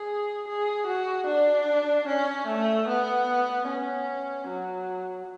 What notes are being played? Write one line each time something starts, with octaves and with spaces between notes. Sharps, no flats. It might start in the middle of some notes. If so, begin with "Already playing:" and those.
Already playing: G#4
G#4
F#4
D4
C#4
A3
B3
C#4
F#3